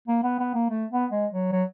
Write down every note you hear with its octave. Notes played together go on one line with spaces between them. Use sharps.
A#3
B3
B3
A#3
A3
B3
G#3
F#3
F#3